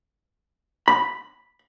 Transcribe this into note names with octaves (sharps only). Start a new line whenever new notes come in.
B5